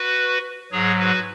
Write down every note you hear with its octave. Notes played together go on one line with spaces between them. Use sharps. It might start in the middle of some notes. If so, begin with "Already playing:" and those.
Already playing: F#4 B4
G#2 F#3 G#4 C#5
F#4 B4